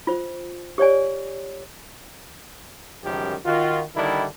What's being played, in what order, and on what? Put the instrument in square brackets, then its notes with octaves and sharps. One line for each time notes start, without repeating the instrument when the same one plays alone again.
[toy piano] F4 C5
G4 C#5 D5 G#5
[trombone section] C#2 F#2 D#3 F3 G3 G4
D#3 F4 F#4
D3 D#3 G3 D4 E4